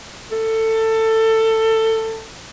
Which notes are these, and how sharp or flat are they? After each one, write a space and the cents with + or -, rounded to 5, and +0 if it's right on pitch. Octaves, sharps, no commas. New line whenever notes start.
A4 +20